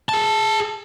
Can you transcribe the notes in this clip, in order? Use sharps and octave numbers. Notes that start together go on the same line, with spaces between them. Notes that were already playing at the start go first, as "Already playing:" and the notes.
G#4 A5